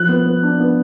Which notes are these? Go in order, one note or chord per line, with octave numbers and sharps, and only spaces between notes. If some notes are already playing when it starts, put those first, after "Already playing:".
Already playing: F3 F#6
B3
B3
D4
B3